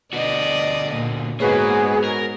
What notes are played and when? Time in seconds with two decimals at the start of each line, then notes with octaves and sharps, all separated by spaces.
0.13 D3 B3 F#4 D5 D#5
0.92 A#2
1.40 G#2 G#3 A#3 B3 F#4 G#4 B4 C#5
2.04 A#4